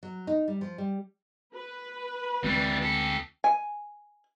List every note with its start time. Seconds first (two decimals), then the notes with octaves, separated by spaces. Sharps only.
0.03 F#3
0.27 D#4
0.48 G3
0.61 F3
0.78 G3
1.54 B4
2.44 D2 E3 G3 G#3 C4
2.82 G4 A4
3.44 G#5